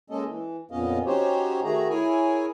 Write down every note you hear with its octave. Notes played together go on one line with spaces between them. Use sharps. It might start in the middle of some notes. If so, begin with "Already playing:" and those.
G#3 A#3 C#4 A4 D#5
E3
F2 A#2 B3 C#4 D#5 F5
C#4 D#4 F#4 G4 C5 C#5
D#3 A3 F#4 G#4 A#5
E4 G#4 A#4 C#5 G#5